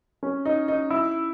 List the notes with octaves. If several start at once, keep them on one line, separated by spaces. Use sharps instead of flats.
C#4
D#4
D#4
E4